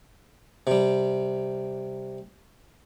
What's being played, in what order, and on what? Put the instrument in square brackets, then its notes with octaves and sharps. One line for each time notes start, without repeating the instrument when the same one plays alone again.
[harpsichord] C3 G3